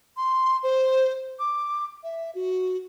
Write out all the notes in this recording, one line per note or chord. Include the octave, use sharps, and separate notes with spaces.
C6
C5
D6
E5
F#4